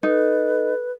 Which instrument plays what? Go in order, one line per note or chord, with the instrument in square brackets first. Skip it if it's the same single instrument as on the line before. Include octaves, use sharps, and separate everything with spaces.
[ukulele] D#4 [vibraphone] A4 [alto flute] B4